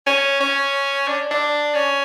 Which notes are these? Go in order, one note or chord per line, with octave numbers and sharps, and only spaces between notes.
C#4
C#4
D4
D4
C#4